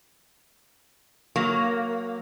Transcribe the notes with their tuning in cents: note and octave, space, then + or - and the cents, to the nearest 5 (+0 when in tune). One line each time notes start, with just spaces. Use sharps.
F#3 +0 A#3 +0